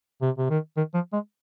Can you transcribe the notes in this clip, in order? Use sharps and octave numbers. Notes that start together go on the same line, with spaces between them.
C3
C3
D#3
D#3
F3
G#3